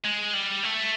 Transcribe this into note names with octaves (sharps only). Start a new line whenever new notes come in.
G#3
G3
A3